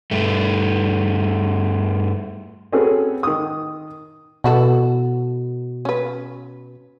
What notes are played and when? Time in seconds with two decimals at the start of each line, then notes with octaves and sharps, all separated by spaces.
0.11 G2 A3
2.72 C4 C#4 F#4 G#4 A4 B4
3.23 D#3 D#6
4.44 B2 E3 F#4 A4
5.85 C#4 B4